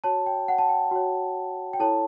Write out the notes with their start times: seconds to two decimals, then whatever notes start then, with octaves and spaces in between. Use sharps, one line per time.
0.04 F#4 C#5 A5
0.26 G5
0.48 F#5
0.58 A5
0.69 G5
0.91 F#4 C#5
1.73 G5
1.79 E4 A4 C#5 A5